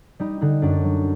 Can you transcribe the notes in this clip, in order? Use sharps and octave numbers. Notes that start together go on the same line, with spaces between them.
G3 D#4
D3 D#4
F#2 D4
F#3